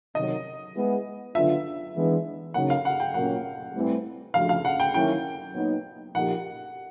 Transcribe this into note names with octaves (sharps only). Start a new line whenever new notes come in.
C3 D#3 F#3 D#5
G#3 B3 E4 G#4
D3 F#3 B3 D4 F4 E5
E3 G#3 B3 D4
C#3 F#3 A#3 D#4 F#5
F5
F#5
G5
A#2 F#3 A#3 C#4 F#5
A2 E3 G3 C4
F3 A3 D4 F#4 F5
F5
F#5
G5
D#3 F#3 A#3 C#4 E4 G5
A#2 F#3 B3 D#4
A#2 F3 A#3 D#4 G4 F#5